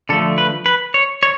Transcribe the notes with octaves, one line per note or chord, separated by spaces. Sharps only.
D3 F3 A3 A4
B4
B4
C#5
C#5